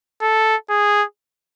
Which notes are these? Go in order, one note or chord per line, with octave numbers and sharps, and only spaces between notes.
A4
G#4